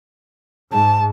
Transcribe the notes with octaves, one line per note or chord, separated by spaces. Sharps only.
G#2 A5